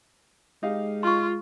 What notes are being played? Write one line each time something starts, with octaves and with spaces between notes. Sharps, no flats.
G#3 D#4 G4 F5
F4 C6 C#6